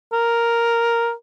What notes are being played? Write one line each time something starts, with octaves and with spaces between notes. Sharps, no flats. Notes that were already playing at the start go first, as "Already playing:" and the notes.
A#4